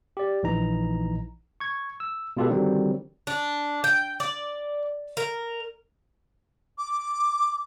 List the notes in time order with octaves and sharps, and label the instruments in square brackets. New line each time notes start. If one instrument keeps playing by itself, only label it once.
[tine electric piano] G4 D5
A#1 E3 D#4 A#5
C#6 G#6
E6
B2 G#3 F4 G4 A4 B4
D3 D#3 F#3 G3 C4
[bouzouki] D4
G5
D5
A#4
[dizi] D6